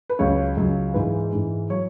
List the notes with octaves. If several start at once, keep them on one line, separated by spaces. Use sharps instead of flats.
B4
C#2 C#3 F#3 C#5
C#2 C#3 F#3
G#2 E3 G#3 B4
G#2 E3 G#3
F#3 C#5